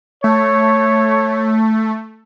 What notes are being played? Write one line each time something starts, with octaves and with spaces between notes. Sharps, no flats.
A3 C#5